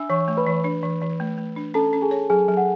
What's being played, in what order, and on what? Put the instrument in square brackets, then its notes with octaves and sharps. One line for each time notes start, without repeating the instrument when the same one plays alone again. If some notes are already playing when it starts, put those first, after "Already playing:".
Already playing: [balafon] D4 [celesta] E5 G#5 E6
[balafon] E3 [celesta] C#5 C#6
[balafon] A3
[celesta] B4 B5
[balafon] E3
D4
E3
E3
A3
A3
D4
[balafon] C#4 [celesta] A4 A5
[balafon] C#4
[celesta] G#4 G#5
[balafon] C#5
[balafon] F#3 [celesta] G#4 G#5
[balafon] F#3
[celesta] F#5